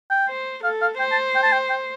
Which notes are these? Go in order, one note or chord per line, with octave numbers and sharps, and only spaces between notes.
G5
C5
A4 F5
F5
C5 G5
A5
G5
A5
G5
G5